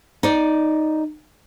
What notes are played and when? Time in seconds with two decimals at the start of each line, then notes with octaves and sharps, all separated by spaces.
0.23 D#4 D5